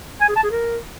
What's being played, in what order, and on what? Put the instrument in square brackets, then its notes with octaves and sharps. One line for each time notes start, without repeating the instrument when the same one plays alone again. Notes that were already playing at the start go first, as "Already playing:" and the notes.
[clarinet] G#5
G#4
A5
G#4
A#4